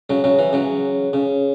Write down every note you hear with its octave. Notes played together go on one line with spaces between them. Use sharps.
C#3 F#3
C#3 F#3
E3
C#3 F#3
C#3